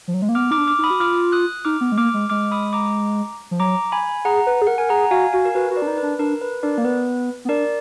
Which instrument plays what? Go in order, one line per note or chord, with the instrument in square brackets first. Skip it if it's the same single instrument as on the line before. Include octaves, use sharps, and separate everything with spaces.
[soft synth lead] F3
F#3
G#3
A#3
[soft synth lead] B3 [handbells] D6 F6
[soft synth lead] D#4 [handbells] D6 F6
[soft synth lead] D4
[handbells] D6 F6
[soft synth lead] D#4
[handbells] B5 D#6
[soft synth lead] F#4
[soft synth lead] F4 [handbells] D6 F6
[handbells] D#6 F#6
[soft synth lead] D#4 [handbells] D6 F6
[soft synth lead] B3
G#3
[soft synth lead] A#3 [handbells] D6 F6
[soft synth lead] G#3
[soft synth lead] G#3 [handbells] D6 F6
[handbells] B5 D#6
A#5 D6
[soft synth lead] F3
[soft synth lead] F#3 [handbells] A#5 D6
[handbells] G#5 B5
[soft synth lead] G#4 [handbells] F#5 A#5
[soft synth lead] B4
G#4
[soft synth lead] A#4 [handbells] F#5
[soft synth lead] A#4 [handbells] G#5
[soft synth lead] G#4 [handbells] F#5 A#5
[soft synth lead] F#4 [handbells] F5 G#5
[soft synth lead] F#4 [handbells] F5 G#5
[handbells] A#4
[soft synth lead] F#4 [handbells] B4
[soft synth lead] F#4 [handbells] B4
[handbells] A#4 D5
[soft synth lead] D4
D#4
[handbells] B4
[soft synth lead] D4
[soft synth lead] D4 [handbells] A#4
[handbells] B4
[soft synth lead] D4 [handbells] A#4 D5
[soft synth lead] A#3
[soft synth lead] B3 [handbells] B4
[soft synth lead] B3
[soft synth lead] D4 [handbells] A#4 D5